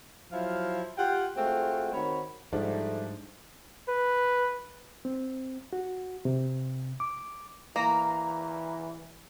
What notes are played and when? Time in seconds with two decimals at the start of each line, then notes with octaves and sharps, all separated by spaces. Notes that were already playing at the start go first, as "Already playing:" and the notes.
0.32 F3 F#3 E4 F5
0.98 F4 G4 F#5 G5
1.36 G#3 A3 C4 F4 F#4
1.93 D#3 C4 F#4 C#5 B5
2.53 G#2 F3 G3 A3 D4
3.88 B4
5.05 C4
5.73 F#4
6.25 C3
7.00 D6
7.76 E3 A#3 A#5